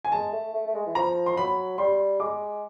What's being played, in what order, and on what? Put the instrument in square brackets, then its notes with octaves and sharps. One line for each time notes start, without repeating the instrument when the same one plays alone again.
[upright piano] G#5
[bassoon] G#3 [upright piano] A5
[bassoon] A3
A3
A3
G#3
E3
[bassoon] F3 [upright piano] A#5
[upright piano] C6
[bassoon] F#3 [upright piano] B5
[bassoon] G3 [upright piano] C6
[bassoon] G#3 [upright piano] D6